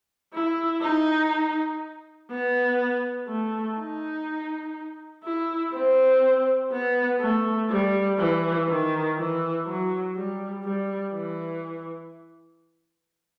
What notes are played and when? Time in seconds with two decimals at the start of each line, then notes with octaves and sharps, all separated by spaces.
0.34 E4
0.83 D#4
2.31 B3
3.28 A3
3.78 D#4
5.24 E4
5.74 C4
6.72 B3
7.21 A3
7.70 G3
8.19 E3
8.69 D#3
9.17 E3
9.67 F#3
10.15 G3
10.64 G3
11.14 E3